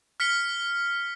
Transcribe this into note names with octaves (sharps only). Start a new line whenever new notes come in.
F6 B6 C#7 G7